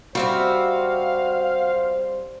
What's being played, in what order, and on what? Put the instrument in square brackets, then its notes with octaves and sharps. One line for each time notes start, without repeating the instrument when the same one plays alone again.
[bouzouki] G3 C4 E5 [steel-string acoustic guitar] F#4 [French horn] C5 [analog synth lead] F5